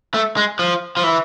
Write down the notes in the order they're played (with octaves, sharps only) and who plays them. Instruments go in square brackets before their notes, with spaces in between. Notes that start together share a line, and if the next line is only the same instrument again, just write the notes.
[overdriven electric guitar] A3
G#3
F3
F3
E3